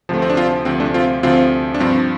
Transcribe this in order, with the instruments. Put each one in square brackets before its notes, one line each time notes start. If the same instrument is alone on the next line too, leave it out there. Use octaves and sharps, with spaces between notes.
[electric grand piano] D2 C3 F3 A3
C4
D4
C4 F4
D2 C3 F3 C4
A3 D4
C4 F4
D2 C3 F3 C4 F4
D4
G2 F3 C4